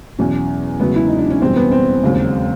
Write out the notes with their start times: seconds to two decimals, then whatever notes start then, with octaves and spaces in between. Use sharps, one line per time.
0.19 E2 B2 F#3 C#4
0.80 E1 D2 C#3 F#3 B3
0.96 E4
1.07 D#4
1.18 D4
1.30 C#4
1.41 F#1 E2 B2 G3 C4
1.56 B3
1.71 C4
2.02 E1 D#2 C#3 F#3